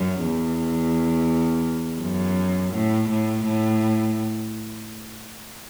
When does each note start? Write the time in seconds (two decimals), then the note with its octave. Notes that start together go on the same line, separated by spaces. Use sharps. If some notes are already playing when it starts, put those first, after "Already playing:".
Already playing: F#2
0.23 E2
2.02 F#2
2.74 A2
3.10 A2
3.44 A2